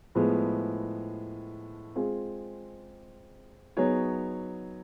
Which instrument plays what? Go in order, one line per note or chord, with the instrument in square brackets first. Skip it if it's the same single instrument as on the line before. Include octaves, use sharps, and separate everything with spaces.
[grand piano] A2 F3 G#3 B3
G#3 C4 F4 G#4
F#3 B3 D#4 G#4 C#5